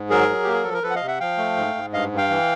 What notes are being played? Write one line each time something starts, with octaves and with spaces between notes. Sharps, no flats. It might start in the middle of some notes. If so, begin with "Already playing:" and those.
Already playing: G#2
F#3 G#4 A#4
F#3
A#3 G4
G#4
F3 A4
A#4
F3 A4 B4
F#5
D#5 F5
C3
E5 F#5
F3 F5 G5
A3
G#2
G#2
G2 D#5 F5
G2
F5 G5
E3